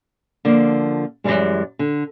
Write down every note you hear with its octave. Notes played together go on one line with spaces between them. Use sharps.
D3 F3 A#3
F#2 A2 E3 G3 G#3
D3